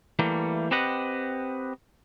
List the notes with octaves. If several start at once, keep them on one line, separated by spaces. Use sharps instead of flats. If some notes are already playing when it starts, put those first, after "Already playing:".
E3 G3 A3 A#3
C4 G4 B4 D#5 F#5